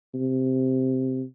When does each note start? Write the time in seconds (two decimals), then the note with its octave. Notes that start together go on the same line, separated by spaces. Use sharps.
0.14 C3